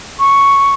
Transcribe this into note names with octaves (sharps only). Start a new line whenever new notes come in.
C#6